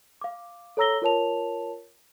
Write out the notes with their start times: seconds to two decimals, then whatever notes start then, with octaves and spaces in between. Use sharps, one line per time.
0.21 F5 D6
0.77 A4 C#5 A#5 E6 A#6 G7
1.02 F4 A#4 C#5 A5 F7